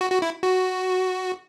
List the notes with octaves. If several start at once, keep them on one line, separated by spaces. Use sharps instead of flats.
F#4
F#4
E4
F#4